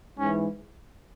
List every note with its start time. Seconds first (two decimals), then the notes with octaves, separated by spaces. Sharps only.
0.19 G#2 E3 C#4